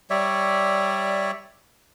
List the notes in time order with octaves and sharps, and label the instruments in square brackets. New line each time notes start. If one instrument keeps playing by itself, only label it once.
[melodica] G3 C#5 D5 E5